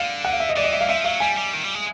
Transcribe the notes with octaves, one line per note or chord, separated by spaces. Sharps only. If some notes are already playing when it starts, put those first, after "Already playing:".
Already playing: D3 F5
F#5
F5
E5
D#5
E3 D5
D#5
E5
F5
F3 E5
F#3 F5
G3 G#5
G3
D#3
G3
G#3